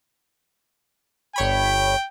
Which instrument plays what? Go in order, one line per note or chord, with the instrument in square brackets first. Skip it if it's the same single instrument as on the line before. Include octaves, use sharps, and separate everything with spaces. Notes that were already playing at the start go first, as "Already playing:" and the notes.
[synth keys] G1 C#5 B5 [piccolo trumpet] G5